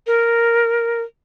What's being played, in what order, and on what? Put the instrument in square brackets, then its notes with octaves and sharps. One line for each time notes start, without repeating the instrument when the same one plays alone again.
[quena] A#4